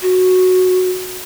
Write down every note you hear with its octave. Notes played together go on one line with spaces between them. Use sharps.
F#4